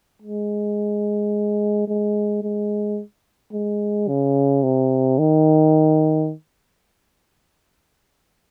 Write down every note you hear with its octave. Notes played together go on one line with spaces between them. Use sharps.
G#3
G#3
G#3
G#3
C#3
C3
D#3